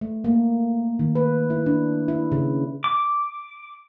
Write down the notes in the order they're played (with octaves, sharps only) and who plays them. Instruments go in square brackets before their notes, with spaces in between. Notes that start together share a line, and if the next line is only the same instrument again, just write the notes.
[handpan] A3
A#3
D#3
B4
E4
D4
E4
C#3
[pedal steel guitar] D6